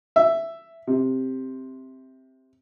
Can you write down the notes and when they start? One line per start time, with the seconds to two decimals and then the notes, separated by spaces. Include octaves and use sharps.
0.16 E5
0.87 C3